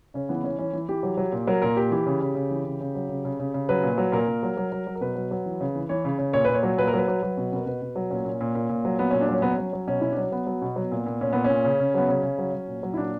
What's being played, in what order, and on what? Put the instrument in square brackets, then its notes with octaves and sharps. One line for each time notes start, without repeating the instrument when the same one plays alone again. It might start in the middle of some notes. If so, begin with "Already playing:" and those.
[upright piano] C#3 C#4
E3 B3
E3 C#4
E3 C#4
E3
E3 G4
F#3
F#3
A#2
F#3 A#4
A#2 A#4
A#2 G4
E3 G4
C#3
C#3
C#3
E3
C#3
C#3
F#3
C#3
C#3
C#3
C#3
F#3 B4
A#2
F#3
A#2 A#4
A#2
F#3
F#3
F#3
F#3
A#4
B2 B4
F#3
F#3
E3
C#3
E3
E3 C#5
C#3
C#3
A#2 C#5
A#2 B4
C#5
F#3
A#2 B4
A#4
F#3 B4
F#3
F#3
B2
B2 A#4
B2 B4
B2
F#3
A#2 C#4
A#2
A#2
A#2
A#2
F#3
F#3 B3
A#2 C#4
D4
F#3 C#4
F#3 B3
C#4
F#3
F#3
B2 C#4
B2 E4
D4
F#3 C#4
F#3 B3
F#3
B2
F#3
A#2
A#2
A#2 C#4
A#2 B3
C#4
A#2
C#3
C#3
F#3 B3
C#3 C#4
C#3
F#3
F#3
A#2
F#3
E4
A#2 D4